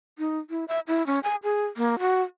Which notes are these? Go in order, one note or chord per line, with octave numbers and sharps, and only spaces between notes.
D#4
E4
E5
E4
C#4
G#5
G#4
A#3
F#4